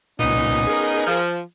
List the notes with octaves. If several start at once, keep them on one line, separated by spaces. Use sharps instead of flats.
C2 A#2 B3 C#4 D#4
G#4 A#4
F3